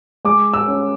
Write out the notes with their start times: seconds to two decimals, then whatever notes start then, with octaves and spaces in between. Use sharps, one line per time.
0.25 G#3 D6
0.54 E6
0.68 C#4